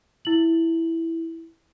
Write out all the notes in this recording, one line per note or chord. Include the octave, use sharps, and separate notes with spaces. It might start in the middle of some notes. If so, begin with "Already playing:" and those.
E4 F#7